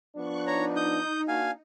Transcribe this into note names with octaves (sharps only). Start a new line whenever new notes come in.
F3 B3 D4 C#6 F#6
D#4 C#5 A#5
D#6 G6
A#3 D4 F#4 F5 G#5